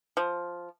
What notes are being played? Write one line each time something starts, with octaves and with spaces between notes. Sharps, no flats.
F3